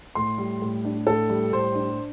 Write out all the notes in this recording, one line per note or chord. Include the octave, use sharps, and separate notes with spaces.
A2 C6
G3
A2
D4
A2 A4
G3
A2 C5
D4